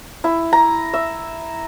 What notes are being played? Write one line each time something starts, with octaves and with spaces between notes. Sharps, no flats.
E4
A#5
E5